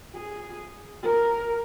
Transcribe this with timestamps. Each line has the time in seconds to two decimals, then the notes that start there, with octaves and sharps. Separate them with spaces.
0.16 G#4
1.02 A#4